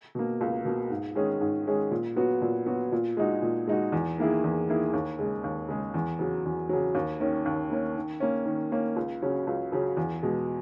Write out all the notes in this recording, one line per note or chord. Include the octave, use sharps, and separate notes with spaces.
B2 A#3
C#2
B2 A#3
G#2
D#3 G#3 C#4 G#4
G#2
D#3 G#3 C#4 G#4
A#2
F#3 B3 F#4
A#2
F#3 B3 F#4
A#2
G#3 D#4 F#4
A#2
G#3 D#4 F#4
E2
D#3 A#3 E4 G#4
E2
D#3 A#3 E4 G#4
D#2
C#3 G#3
D#2
C#3 G#3
E2
C#3 F#3
E2
C#3 F#3
D#2
D#3 A#3 C#4
D#2
D#3 A#3 C#4
D#3
A#3 C#4
D#3
A#3 C#4
C#2
C#3 F#3 C#4
C#2
C#3 F#3 C#4
E2
B2 G#3